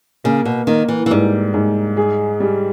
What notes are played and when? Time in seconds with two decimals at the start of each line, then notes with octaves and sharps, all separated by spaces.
0.24 C#3 A#3
0.45 B2
0.67 D#3 A#3
0.88 E3
1.06 E3
1.11 G#2 G3
1.54 G#2
1.97 G#4
2.40 G3